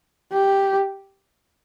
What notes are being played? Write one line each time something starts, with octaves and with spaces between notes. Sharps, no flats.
G4